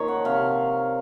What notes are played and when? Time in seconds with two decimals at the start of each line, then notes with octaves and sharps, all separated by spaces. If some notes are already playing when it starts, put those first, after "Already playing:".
Already playing: A#2 D#3 F3 C#5
0.08 F#5
0.25 C3 F5